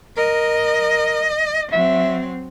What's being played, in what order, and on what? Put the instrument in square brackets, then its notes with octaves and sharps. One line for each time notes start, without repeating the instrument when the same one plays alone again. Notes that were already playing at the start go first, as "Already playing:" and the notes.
[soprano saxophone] A#4 [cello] D#5
[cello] F#3 C4 [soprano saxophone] E5